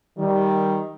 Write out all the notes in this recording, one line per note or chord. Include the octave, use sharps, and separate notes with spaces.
D#3 G3